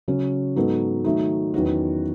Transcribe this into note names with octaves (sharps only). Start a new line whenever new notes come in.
C#3 F#3 C#4
G#2 F#3 B3 D#4 A4
D#3 F#3 A3 D#4
E2 D#3 F#3 C#4 F#4